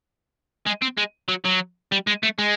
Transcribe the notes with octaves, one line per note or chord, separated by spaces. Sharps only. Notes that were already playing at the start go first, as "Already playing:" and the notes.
G#3
C4
G#3
F#3
F#3
G3
G#3
A3
G#3